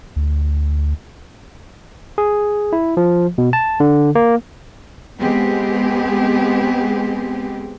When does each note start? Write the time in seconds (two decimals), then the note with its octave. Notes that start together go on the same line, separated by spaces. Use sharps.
0.16 D2
2.18 G#4
2.73 E4
2.97 F3
3.38 B2
3.53 A5
3.80 D3
4.15 A#3
5.19 G#3 B3 C4 G4 G#4